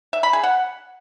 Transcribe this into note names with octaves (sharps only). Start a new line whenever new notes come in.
E5
B5
G#4
F#5